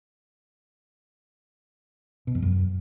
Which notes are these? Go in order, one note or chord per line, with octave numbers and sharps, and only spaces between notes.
B2
F2
F#2